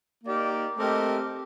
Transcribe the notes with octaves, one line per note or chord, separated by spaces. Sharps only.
A#3 D#4 G4 A#4 D5
A3 C4 G4 A#4 D#5